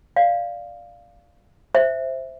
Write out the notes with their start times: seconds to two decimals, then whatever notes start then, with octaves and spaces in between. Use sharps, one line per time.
0.16 D5 F5
1.75 C5 E5